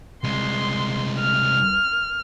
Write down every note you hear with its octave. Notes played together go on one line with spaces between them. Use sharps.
C2 G#3 C6
F6